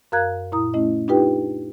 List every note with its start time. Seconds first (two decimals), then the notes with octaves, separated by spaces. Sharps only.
0.12 F#2 A#4 F5 A#5 F#6 G#6
0.52 A#2 E4 A#5 D#6
0.74 A3 C#4 E4 D#5
1.08 D4 D#4 F4 G4 B4 G5